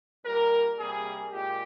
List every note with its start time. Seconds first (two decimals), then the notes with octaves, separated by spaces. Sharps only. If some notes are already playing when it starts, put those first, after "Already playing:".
0.25 A#2 G3 A#3 A#4
0.78 C3 G3 A#3 G#4
1.32 A#2 G#3 G4